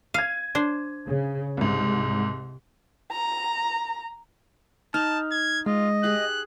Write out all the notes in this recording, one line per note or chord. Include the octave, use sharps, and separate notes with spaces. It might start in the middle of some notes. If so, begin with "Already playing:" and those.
F5 G#6 D#7
D4 C5
C#3
C2 G#2 C3
A#5
D#4 A5 F6
G#6
G#3 F4 D#5
G4 G#4 F#6